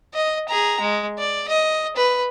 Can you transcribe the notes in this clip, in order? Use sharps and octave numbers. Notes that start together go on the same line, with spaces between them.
D#5
G#4 A#5
G#3
D5
D#5
B4